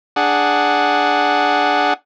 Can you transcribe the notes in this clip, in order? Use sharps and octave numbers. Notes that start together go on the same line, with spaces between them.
D4 G#4 F#5